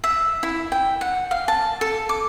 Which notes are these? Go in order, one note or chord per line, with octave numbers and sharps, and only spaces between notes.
E5
E4
G5
F#5
F5
A5
A4
D6